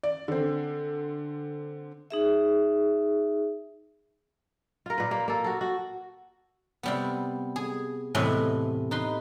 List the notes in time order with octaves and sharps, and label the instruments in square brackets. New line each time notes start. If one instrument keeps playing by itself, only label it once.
[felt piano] D5
D3 C4
[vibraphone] D#4 G#4 E5
[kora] F4 A#4
A#2 B4
A#3
A#3 A4
F#4 A4
F#4
[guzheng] C3 G3 B3
G#4
E2 A2 C3 B4 D#5 G#5
D#4 B4 C6